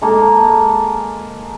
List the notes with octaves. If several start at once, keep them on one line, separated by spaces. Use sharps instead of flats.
G#3 A#3 A4